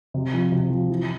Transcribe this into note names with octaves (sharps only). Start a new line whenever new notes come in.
C3
F3
C3
F3
E3